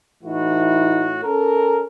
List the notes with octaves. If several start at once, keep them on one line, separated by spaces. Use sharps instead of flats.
A2 E3 A3 D#4 E4 F#4
C#4 A4 A#4